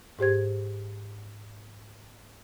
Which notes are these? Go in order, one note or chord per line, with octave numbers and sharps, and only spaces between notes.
G#2 G4 C5 G#6